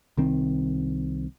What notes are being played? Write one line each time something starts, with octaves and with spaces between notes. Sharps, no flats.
C2 D#3 C4